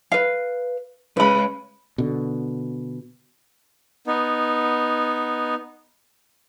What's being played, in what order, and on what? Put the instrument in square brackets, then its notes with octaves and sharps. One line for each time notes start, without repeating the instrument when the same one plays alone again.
[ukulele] B4 F5
[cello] C#3 G#3 [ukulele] B4 B5
[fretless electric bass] B2 D3
[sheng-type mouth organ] B3 D#4